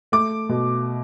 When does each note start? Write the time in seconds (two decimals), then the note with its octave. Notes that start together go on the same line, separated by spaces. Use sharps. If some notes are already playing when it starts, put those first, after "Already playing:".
0.12 A3 D6
0.49 B2